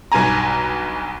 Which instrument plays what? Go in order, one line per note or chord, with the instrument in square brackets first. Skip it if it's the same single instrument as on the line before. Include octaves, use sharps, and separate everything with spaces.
[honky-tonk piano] B1 G2 G#5 A#5